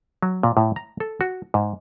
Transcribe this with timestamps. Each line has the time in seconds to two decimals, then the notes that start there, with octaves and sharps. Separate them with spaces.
0.22 F#3
0.43 A#2
0.57 A2
0.76 A#5
1.00 A4
1.21 F#4
1.54 G#2